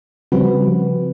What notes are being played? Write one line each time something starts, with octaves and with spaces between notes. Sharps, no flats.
C#3 F3 G3 C4 F#4 B4